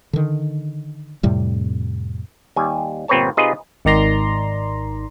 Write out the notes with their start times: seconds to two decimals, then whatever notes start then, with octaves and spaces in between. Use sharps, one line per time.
0.13 D3 D#3
1.23 F2 A2 C3 G3
2.56 D#2 G3 G#5
3.08 G1 A#2 C4 B4 C#5 A5
3.37 C3 D#4 F4 G#4 B4 D#5
3.85 G#1 D#3 D5 A#5 C6